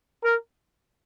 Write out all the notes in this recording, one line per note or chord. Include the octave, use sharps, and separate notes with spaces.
A#4